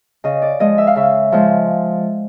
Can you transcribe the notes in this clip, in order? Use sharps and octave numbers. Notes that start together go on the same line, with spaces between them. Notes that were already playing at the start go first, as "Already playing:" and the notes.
C#3 D#5
D5
F3 G#3 D#5
E5
F5
C#3 E5
F3 G#3